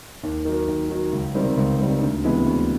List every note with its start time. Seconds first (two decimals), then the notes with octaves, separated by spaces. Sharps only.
0.23 D#2
0.45 D#3 F#3
0.68 D#2
0.90 D#3 F#3
1.12 C#2
1.35 C3 D#3 G3 C4
1.57 C#2
1.79 C3 D#3 G3 C4
2.02 D2
2.24 C3 E3 G#3 B3
2.46 D2